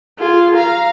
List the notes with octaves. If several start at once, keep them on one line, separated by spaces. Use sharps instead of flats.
F4 G#4
F5 A#5